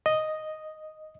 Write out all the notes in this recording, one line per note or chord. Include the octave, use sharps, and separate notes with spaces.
D#5